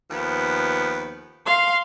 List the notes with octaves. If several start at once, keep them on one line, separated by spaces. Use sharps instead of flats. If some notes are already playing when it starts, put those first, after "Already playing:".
D#2 F3 B3
F5 C6